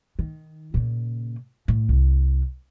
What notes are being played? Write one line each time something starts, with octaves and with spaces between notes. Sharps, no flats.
D#3
A#2 C#3
A2
C2